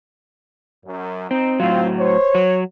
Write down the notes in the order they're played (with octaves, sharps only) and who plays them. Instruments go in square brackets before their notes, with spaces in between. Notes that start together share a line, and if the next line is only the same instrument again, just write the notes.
[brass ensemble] F#2
[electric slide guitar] C4 [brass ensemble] D#4
[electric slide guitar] A2 F#3 [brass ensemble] C4 [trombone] F4
[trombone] C5 [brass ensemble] C#5
[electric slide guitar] F#3